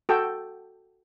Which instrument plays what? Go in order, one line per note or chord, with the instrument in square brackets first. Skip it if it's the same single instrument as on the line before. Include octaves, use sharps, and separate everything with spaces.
[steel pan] F#4 A4 G5 A5 E6